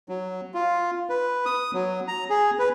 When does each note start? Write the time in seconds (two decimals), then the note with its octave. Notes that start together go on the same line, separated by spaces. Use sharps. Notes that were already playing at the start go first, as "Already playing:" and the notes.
0.09 F#3
0.54 F4
1.10 B4
1.46 D#6
1.74 F#3
2.08 A#5
2.30 G#4
2.59 B4